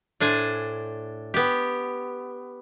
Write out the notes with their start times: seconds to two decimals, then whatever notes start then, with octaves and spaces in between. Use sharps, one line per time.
0.20 A2 D4 C5 G#5
1.34 B3 G4